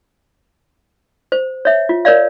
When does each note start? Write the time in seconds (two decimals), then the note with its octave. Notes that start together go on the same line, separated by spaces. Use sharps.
1.32 C5
1.65 C#5 E5
1.89 F4
2.05 A#4 C#5 D5 F5